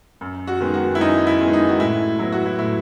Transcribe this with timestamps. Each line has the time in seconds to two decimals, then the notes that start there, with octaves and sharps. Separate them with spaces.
0.21 F#2
0.47 F#4
0.60 D#3 G#3 B3
0.74 F#4
0.95 E4
1.00 F#2 D#4
1.27 E4
1.40 D#3 G#3 B3
1.53 D#4
1.69 F#4
1.79 A2 E4
2.19 F#3 B3 E4
2.32 F#4
2.46 E4
2.59 A2 E4